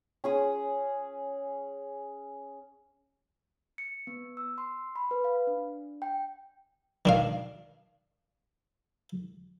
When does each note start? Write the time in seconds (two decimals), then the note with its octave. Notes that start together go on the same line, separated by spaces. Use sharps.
0.24 C#4 G#4 D#6
3.78 C#7
4.07 B3
4.37 E6
4.58 C6
4.96 B5
5.11 B4
5.24 F5
5.47 D4
6.02 G5
7.05 D#3 D4 F5